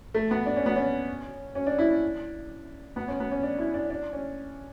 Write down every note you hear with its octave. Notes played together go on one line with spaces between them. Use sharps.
A3
B3
D4
C#4
B3
C#4
C#4
D4
E4
D4
B3
C#4
B3
C#4
D4
E4
D4
D4
C#4